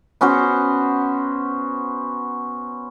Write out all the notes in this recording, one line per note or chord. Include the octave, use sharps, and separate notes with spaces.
B3 C#4 F#4 C5